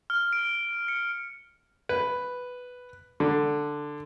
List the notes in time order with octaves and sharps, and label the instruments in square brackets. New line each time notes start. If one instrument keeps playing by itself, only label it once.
[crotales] F6
D7
C#7
[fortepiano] B4
D3